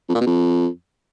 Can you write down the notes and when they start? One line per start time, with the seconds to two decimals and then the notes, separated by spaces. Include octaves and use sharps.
0.09 F2
0.15 A#2
0.21 B2
0.27 F2